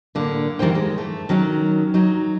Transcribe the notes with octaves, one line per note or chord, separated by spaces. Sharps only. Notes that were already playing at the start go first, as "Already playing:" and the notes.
A2 D3 A#3
D#3 E3 G3 C5 G5
G#3
A3
D#3 F#3 C#4 D#4
F#3 D#4